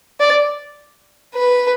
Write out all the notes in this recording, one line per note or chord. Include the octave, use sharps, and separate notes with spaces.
D5
B4